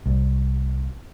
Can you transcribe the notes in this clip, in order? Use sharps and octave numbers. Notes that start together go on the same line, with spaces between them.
C2